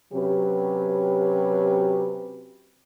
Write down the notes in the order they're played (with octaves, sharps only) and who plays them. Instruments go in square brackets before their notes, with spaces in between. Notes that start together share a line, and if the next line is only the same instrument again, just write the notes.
[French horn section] C3 F#3 C#4 G4 B4